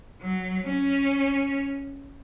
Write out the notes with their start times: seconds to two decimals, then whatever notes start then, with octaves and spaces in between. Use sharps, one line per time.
0.21 F#3
0.65 C#4